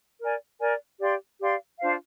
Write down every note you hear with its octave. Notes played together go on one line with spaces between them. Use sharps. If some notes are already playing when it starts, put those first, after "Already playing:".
A#4 D5 G#5
A#4 D5 G#5
G4 D5 F5 C6
G4 D5 F5 C6
D4 F4 C5 F5